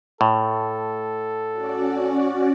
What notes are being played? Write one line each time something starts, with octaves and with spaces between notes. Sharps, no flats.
A2 A4
C#4 F#4 D5